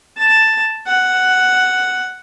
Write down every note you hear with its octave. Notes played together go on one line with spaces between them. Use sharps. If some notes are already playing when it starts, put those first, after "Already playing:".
A5
F#5